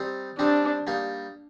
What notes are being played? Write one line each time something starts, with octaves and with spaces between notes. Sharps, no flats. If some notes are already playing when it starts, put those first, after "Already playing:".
Already playing: G3 C4 D#4
G3 C4 D4 D#4
G3 A#3 D#4